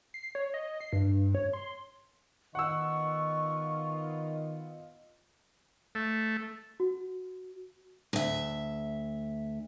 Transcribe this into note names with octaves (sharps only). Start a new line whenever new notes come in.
C7
C#5
D#5
C7
G2
C#5
C6
D#3 B3 F4 D#5 F#5 C#6 E6
A3
F#4
D2 E5